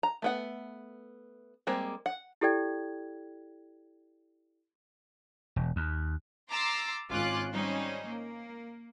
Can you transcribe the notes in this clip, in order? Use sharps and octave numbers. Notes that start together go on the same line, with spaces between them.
A#5
A3 B3 F#5
G3 G#3 A#3 C4
F#5
E4 G4 A4 D5 G5 G#6
E1
D#2
A#5 C6 D6 E6 A6 C7
G#1 C#4 F4 C6 D6 F#6
G3 C#4 D#4 C5
A#3